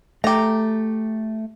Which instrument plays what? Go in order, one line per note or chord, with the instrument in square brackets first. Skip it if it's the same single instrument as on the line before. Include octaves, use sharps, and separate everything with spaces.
[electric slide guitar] A3 [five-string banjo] G4 A#5